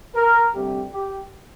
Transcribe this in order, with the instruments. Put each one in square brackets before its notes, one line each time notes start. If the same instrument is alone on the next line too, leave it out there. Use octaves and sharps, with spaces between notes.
[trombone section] A#4
D2 C3 G3 C4 G4
G4